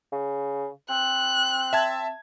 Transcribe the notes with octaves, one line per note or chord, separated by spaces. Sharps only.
C#3
C4 F#6
E5 A5 G#6